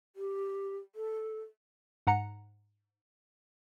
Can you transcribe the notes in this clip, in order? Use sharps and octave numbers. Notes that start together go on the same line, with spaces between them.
G4
A4
G#2 F#5 A#5 C#7